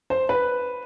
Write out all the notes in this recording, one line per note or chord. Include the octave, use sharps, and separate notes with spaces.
C5
B4